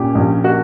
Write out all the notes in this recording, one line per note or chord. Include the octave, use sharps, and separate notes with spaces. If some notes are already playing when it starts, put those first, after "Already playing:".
Already playing: A#2 A#3 C#4 G4
A#1
A#3 F#4